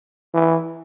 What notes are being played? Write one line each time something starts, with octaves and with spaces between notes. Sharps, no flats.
E3